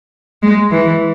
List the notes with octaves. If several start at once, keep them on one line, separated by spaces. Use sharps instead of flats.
G#3
E3